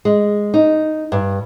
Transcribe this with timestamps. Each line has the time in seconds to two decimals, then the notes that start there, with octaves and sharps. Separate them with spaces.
0.05 G#3
0.54 D#4
1.12 G2